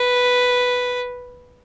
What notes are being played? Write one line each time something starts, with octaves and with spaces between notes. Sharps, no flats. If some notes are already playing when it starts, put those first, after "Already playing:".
Already playing: B4